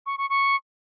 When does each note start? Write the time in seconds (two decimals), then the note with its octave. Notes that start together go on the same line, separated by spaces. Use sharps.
0.06 C#6
0.18 C#6
0.30 C#6